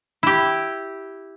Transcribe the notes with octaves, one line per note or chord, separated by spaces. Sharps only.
E4 G4